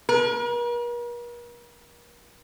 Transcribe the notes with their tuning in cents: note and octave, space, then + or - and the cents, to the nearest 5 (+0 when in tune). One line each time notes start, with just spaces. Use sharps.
A#4 +45